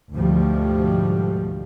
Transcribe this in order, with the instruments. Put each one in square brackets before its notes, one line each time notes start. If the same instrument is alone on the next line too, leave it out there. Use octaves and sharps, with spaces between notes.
[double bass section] D2 G#2 B2 F3 G3 A3